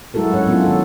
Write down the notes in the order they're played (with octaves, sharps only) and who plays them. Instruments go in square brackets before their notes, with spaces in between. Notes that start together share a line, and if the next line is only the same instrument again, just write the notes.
[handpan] F#3 G#3 E4 F#4 A4 A#4
C#4 C#5 F#5
F#3 B3 C#4 D4 E4 F4
D#3 A4